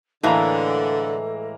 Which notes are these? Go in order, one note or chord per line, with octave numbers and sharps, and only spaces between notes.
A2 D3 E3 G#3 A#3 A4 A#5